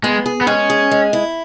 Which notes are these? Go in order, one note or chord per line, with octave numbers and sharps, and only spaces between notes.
G#3 B3
G#4
B3
G#3 C#4
G#4
G#3
E4